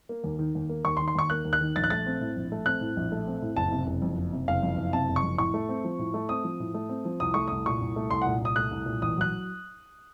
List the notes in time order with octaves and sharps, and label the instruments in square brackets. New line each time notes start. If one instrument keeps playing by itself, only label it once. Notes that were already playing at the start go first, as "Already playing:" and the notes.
[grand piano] A#3
D#2
D#3
D#2
A#3
D#2 C#6
C6
D#3
C6
D#2 C#6
A#3 F#6
D#2
F#6
D#3
A#1 A6
F#6
A3 A6
C4
A2
A#1
A3
C4 F#6
A2
A#1
A3
C4
A2
F#1 A5
C3
F#1
F2
F#1
C3
F#1 F5
F2
F#1
C3 A5
F#1
C#6
F2
A2 C#6
A3
C4
F3
A2
A3
C4 D#6
F3
A2
A3
C4
F3
C2 D#6
A3 C#6
C2 D#6
A#2 C#6
C2
A3
C2 C6
A#2 F#5
C2 D#6
A3 F#6
C2
A#2
A1 D#6
F#3 F#6